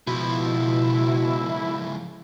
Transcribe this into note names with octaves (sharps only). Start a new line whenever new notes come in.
C#2 B2 F3 E4